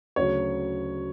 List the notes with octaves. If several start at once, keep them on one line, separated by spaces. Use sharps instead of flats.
D2 C#3 F#3 C#5